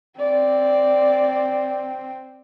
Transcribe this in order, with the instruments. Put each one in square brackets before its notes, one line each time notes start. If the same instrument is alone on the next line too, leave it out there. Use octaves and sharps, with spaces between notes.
[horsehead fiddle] C4 [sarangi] D5